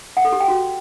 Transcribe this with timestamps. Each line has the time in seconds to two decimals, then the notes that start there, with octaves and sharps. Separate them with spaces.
0.17 F#5
0.25 A4
0.32 G4
0.40 G5
0.48 F#4